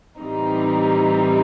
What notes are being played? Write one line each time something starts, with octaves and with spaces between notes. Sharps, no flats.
A2 E3 G3 C4 D#4